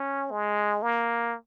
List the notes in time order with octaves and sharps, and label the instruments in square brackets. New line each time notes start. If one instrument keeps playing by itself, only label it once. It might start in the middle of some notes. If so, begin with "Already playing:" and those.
Already playing: [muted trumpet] C#4
G#3
A#3